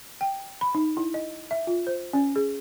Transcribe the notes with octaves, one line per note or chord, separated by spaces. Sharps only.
G5
B5
D#4
E4
D#5
E5
F4
C5
C#4
G#4